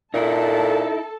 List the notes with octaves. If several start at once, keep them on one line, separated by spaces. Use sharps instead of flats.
A#2 D#4 E4 A4 A5